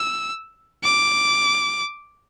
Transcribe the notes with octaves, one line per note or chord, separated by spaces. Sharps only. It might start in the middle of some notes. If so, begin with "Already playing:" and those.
Already playing: E6
D6